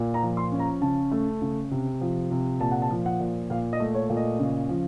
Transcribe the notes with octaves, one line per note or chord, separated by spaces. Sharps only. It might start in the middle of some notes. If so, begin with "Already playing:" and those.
Already playing: A#2
A#5
F3
C6
C#4
A#5
C#3 A5
A3
C#3
C3
F3
C3
A#2 A5
F#5
A5
F3
F#5
A#2
A#2 F5
D#5
A3
C#5
A#2
D#5
C#3
F3